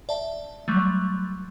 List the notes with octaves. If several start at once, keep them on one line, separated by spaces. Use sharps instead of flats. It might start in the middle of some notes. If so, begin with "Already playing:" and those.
D5 E5 A5
F#3 G3 A3